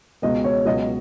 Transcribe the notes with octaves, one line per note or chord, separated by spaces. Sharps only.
C#2 B2 G#3 B3 D#5
C#5
C#2 B2 F#3 D#5